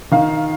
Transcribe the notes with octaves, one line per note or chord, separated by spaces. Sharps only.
D#3 F5